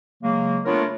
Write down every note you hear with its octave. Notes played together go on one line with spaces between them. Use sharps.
C#3 F#3 G#3 A#3
A3 B3 D4 F4 A#4 C#5